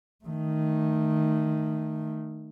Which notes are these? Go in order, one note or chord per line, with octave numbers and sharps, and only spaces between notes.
D#3 A3